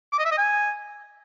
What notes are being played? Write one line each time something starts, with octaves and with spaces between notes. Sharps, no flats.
D6
D#5
E5
D#5
G#5